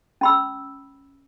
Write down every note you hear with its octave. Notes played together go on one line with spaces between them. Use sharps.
C#4 B5 E6